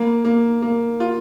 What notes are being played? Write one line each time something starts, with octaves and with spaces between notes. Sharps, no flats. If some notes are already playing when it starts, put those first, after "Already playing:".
Already playing: A#3
A#3
A#3
F4